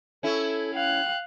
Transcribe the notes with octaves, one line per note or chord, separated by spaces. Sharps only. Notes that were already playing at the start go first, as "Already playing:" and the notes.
C#4 E4 A4
F5 G5 F#6